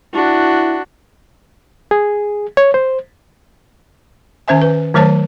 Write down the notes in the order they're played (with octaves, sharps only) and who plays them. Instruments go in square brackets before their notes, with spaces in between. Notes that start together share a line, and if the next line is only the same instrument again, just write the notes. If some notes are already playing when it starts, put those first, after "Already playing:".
[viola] D4 F#4 [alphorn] E4
[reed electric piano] G#4
C#5
C5
[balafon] D#3 C#4 C5 E5 G#5
B4
D#3 F#3 A3 C5 C#5 A5